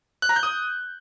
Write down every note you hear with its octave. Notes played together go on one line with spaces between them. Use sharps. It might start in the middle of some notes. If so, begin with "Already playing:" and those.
F#6
A#5
G6
D#6